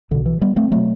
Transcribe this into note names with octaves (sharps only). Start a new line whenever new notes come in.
B1 B2 D3
E3
G3 B3
A3 C4
B2 F#3 A3